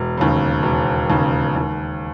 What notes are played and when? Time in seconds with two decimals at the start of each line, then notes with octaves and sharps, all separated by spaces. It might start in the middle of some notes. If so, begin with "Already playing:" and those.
Already playing: E1
0.17 D#2 C#3
0.63 E1
1.10 D#2 C#3
1.56 D#2